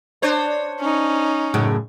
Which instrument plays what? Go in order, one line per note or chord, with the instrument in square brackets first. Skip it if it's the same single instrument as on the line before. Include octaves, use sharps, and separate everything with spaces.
[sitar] D4 C5 C#5
[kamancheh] C#4 D#4
[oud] F#2 A2 C#3